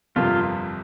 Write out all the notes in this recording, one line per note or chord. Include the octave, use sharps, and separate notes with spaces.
G1 F2 C3 F3 A#3 F4